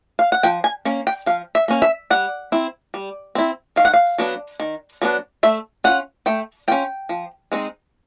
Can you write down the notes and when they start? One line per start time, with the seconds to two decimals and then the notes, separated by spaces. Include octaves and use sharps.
0.19 F5
0.32 F#5
0.43 F3 G5
0.64 G#5
0.85 A#3 C#4
1.07 G5
1.26 F3 F5
1.55 E5
1.68 A#3 C#4
1.82 E5
2.10 G3 F#5
2.52 C4 E4
2.94 G3
3.35 C4 E4
3.76 D#3 F5
3.85 F#5
3.94 F5
4.18 F#3 B3 D4
4.60 D#3
5.02 F#3 B3 D4
5.43 A3 E5
5.84 C#4 F4 F#5
6.26 A3 G5
6.68 C#4 F4 G5
7.09 F3
7.52 G#3 C4 D#4